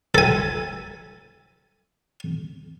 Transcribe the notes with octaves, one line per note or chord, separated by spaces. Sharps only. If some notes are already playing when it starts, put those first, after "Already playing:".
A4 G#5